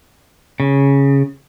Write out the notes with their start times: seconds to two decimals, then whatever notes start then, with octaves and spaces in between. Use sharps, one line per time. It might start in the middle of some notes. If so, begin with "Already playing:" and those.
0.60 C#3